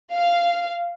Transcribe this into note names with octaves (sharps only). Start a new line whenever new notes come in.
F5